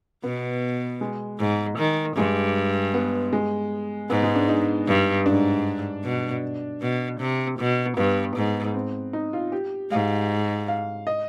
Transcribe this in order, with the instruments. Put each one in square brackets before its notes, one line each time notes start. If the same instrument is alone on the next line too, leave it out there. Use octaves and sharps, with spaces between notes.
[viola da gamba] B2 [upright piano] B3
[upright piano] G#3
[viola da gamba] G#2
D#3
[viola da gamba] G2 [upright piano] G#3
[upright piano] B3
G#3
[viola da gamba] G#2 [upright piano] B3
[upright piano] G#3
D4
D#4
[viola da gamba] G2
[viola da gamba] G#2 [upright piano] D4
[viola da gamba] B2
B2
C3
B2
[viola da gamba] G2 [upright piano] B3
[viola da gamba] G#2
[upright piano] C4
D#4
F4
G4
[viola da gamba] G#2 [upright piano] F5
[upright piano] F5
D#5